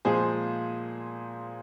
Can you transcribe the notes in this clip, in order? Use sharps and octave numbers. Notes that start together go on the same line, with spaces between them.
A#2 F3 G#3 G#4 C5